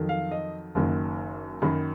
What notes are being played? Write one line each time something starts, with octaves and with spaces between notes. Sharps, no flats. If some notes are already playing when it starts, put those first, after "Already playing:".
Already playing: F2 D#3 F#3
F5
D#5
F#1 F#2 D#3
F#2 D#3 F#3 B5